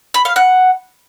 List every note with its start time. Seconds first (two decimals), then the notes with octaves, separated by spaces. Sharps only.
0.14 B5
0.25 F5
0.36 F#5